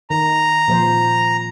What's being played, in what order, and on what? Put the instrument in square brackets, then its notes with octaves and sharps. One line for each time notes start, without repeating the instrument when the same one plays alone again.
[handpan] D#3 [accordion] A#5
[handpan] A#2 F3 C5